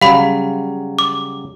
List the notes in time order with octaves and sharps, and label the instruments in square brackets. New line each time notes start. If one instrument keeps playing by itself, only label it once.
[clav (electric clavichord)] C#3 F#3 G3 [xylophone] F5 B5
[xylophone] D6